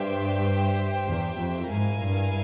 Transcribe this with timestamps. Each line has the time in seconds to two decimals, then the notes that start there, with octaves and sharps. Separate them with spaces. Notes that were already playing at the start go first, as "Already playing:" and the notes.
Already playing: G2 G4 C5 E5 G5
1.07 E2
1.39 F2
1.70 G#2 E4 A#4 F5 G#5
2.02 G2